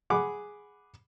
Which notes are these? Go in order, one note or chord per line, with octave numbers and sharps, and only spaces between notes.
G#4 F#5 B5 D6